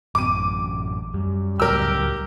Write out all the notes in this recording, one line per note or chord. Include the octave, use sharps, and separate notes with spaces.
A1 F#2 D6 D#7
F#2 G3
C#2 A2 F#3 G4 A#4 E6